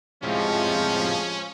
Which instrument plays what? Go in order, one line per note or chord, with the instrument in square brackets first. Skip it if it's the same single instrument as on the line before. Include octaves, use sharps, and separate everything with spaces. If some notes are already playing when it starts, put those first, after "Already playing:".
[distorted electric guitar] A2 C3 [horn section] F3 [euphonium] G#3 [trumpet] C#4